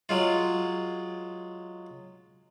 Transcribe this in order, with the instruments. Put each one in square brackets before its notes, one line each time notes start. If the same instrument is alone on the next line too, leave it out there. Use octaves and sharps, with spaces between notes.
[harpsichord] F#3 G#3 F4